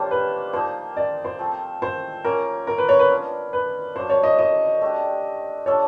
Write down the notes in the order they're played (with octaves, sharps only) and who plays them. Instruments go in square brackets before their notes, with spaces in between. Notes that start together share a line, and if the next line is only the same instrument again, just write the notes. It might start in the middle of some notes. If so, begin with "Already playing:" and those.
Already playing: [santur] G3 A#3 D4 F4 [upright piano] C5 C#5
[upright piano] B4
[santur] F3 A#3 D#4 [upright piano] C5
[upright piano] D5
C5
[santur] F3 A3 C4
[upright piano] C5
[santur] A#3 C#4 F4 [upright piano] A#4
[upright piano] A#4
B4
C#5
B4
[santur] B3 D4 F4
[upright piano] B4
[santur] F#3 A#3 D4 F#4 [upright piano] C5
[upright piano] C#5
D#5
D#5
[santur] A3 D4 G4
[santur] D4 F4 A4 [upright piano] C#5